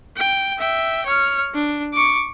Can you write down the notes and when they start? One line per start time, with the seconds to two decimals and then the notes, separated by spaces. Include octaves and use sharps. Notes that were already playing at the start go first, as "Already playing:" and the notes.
0.17 G5
0.59 E5 G5
1.06 C#5 F6
1.54 D4
1.94 C#6 D6